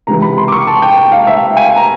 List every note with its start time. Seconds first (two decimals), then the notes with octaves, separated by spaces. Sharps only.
0.07 C#2 C3 E3 A#5
0.22 B5
0.38 C6
0.48 D6
0.52 C#6
0.67 A5
0.82 G5
0.97 G5
1.12 F5
1.27 E5
1.57 G#5
1.76 A#5